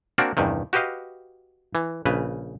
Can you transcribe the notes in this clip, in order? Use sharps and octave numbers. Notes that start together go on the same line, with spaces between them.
A#3 C4 D4 F#4 A#4 D5
E2 G2 C3 D#3
F#4 G4 B4 D#5 F5
E3
A#1 C#3 B4